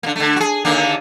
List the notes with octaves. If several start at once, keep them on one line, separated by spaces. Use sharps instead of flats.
D3 A#3
D3 A3
F#4 G#4
D#2 D3 A#3